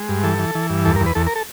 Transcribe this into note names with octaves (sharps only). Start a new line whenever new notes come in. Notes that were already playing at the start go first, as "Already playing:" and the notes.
Already playing: G#3
G2
E3 A4
E3
E3
G2
E2 A4
A#4
E2
B4
E2 A4
A#4
A4